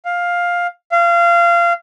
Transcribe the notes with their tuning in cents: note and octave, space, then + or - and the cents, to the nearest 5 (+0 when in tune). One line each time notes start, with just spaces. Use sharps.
F5 +10
F5 -25